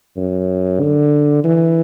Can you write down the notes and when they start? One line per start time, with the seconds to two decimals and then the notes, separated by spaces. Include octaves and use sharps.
0.17 F#2
0.81 D3
1.44 E3